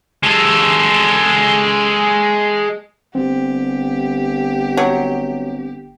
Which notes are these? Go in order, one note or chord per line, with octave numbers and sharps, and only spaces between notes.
G#3 A4
G1 C4 G4
F#3